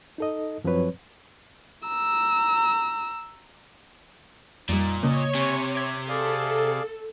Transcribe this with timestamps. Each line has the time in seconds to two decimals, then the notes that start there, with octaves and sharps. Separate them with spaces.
0.18 D#4 A4 D#5
0.64 F#2 F3 F#3 C4 B4 C#5
1.87 A#5 E6
4.69 F2 A#2 G3 D#4
5.03 C#3 A#3 C#5 D#5
5.35 C3 G#5 C#6
5.75 E5 D6 G#6
6.09 G#4 A4 D5 F5